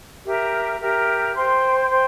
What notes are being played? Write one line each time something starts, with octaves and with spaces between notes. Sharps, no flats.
G4 A#4 E5 A#5
G4 A#4 E5 A#5
C5 G5 C6
C5 G5 C6